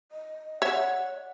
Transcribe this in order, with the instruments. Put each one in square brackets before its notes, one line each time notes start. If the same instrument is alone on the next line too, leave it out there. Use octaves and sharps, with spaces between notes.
[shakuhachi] D#5
[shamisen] C#5 E5 [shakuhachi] D5 [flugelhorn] F#5